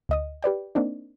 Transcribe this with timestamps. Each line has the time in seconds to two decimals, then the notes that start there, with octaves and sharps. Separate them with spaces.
0.09 D2 D#5 D#6
0.42 G4 B4 D5 G5
0.75 A#3 C4 D4 D#4